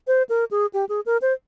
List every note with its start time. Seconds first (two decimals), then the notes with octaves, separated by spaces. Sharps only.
0.07 C5
0.29 A#4
0.51 G#4
0.73 G4
0.89 G#4
1.06 A#4
1.22 C5